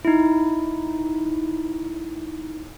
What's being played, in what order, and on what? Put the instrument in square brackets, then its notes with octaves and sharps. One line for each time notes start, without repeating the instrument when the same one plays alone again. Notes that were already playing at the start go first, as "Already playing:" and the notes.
[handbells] D#4 E4